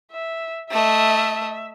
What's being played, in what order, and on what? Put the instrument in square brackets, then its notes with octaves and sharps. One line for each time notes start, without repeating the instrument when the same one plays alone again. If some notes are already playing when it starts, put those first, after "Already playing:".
[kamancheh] E5
[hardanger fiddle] A3 D#5 [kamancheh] E5